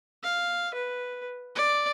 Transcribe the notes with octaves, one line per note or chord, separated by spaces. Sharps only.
F5
B4
D5